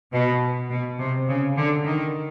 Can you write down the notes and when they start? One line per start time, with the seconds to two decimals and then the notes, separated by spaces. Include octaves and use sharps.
0.12 B2
0.70 B2
0.99 C3
1.28 C#3
1.57 D3
1.85 D#3